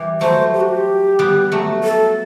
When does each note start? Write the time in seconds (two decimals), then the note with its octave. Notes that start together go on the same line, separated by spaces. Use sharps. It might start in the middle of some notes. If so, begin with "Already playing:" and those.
Already playing: E3 G3
0.21 F#3 A3 C5
0.54 G4
0.61 F#4
0.69 G4
1.19 G3 B3
1.52 F#3 A3
1.84 A4